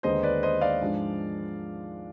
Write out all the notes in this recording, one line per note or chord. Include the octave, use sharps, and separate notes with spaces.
D#2 D3 G#3 B3 D#4 C5 D#5
B4 D5
C5 D#5
D5 F5
G#2 F3 G#3 D4